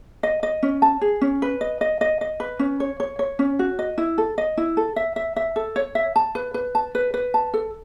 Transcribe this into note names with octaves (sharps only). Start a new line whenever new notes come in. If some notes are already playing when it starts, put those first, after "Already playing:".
D#5
D#5
C#4
A5
G#4
C#4
B4
D#5
D#5
D#5
D#5
B4
C#4
C#5
C#5
C#5
C#4
F#4
D#5
E4
A4
D#5
E4
A4
E5
E5
E5
A4
C#5
E5
A5
B4
B4
A5
B4
B4
A5
A4